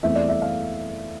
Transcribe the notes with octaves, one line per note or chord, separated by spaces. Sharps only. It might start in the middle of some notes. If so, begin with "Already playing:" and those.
E2 E3 A3 C4 E5
D5
E5
F5